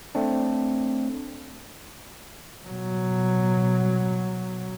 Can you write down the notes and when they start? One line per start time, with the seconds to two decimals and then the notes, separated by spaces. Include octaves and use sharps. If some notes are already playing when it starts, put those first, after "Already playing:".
0.15 A3 C4 D4
2.67 B2 F#3